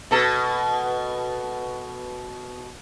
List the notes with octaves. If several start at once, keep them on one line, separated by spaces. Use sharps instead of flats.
B2 A4